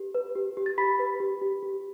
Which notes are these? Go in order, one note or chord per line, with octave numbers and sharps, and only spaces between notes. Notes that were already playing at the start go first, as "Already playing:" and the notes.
Already playing: G4 B4
B4
G4
G4
A6
G4 B5 B6
B4
G4
G4
G4